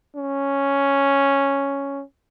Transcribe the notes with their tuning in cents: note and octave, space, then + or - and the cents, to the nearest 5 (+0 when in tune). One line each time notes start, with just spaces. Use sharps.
C#4 +0